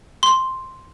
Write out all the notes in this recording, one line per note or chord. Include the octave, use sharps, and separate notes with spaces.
C6